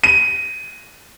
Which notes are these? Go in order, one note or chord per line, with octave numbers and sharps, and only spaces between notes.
D#7